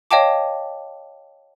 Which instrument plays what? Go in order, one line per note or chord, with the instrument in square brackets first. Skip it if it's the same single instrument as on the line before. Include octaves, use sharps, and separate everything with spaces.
[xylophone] C#5 D#5 F5 G5 A5 D6